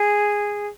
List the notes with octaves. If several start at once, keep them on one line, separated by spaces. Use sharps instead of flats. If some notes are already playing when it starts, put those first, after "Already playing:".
Already playing: G#4